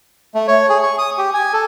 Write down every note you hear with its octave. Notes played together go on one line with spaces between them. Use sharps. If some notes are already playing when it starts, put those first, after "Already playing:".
A3
C#5
G#4
C#6
D#6
G4
G#5
A4